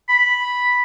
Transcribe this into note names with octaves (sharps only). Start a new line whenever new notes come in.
B5